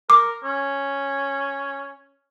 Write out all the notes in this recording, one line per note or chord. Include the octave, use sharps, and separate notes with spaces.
A#4 D6
C#4